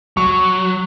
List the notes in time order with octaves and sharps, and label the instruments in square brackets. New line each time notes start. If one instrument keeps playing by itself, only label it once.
[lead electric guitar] F#3 [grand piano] C#6